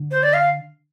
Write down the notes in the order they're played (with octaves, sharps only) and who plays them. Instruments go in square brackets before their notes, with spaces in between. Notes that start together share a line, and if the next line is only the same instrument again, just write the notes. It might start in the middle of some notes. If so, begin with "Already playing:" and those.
Already playing: [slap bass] D3
[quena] C5
D5
F5